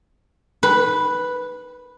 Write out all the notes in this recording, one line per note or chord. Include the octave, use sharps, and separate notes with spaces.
B4